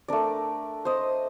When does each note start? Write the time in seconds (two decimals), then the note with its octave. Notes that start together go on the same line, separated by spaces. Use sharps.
0.08 A3 D4 A#4 D5
0.85 C5 D#5